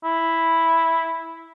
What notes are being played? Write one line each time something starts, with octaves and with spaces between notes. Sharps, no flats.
E4